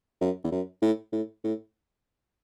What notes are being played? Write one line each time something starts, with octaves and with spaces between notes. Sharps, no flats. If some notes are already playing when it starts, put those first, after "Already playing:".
F#2
E2
F#2
A2
A2
A2